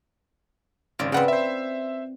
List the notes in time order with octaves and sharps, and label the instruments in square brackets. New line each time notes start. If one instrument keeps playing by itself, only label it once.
[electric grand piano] G#1 [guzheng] C#3 F4 D5
[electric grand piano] C#3 F#5 [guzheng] C4 B4 D5
[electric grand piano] C5 E5